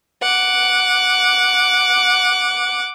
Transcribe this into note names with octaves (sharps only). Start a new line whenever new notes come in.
F#5 D6